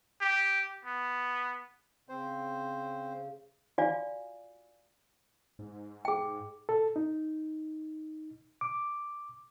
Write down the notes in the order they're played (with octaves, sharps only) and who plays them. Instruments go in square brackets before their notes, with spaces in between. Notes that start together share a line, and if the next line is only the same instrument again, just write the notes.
[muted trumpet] G4
B3
[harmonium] C#3 [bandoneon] C4 C5
[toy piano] F4 F#4 D5 F5 G#5
[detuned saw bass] G#2
[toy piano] G#4 G5
[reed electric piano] A4
D#4
D6